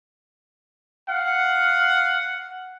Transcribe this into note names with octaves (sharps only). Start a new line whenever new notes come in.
F5 F#5